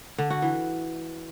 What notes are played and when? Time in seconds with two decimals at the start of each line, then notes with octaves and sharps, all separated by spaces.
0.18 D3
0.30 F#4
0.42 E3